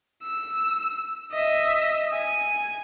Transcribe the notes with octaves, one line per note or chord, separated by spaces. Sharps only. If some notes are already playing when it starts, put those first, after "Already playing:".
E6
D#5 E5
G#5